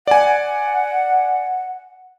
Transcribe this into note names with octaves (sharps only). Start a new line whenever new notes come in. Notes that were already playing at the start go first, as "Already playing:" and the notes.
D5 F#5 G#5